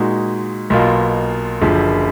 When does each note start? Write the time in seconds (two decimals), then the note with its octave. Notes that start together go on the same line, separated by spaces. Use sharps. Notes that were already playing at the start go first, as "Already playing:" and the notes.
Already playing: A#2 G#3 D#4 F#4
0.70 B1 B2 A#3 F4
1.62 F#1 F#2 D3 F3